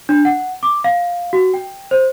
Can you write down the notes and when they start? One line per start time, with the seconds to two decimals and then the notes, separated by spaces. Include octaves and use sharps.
0.09 D4
0.25 F#5
0.63 D6
0.84 F5
1.33 F#4
1.54 G5
1.91 C5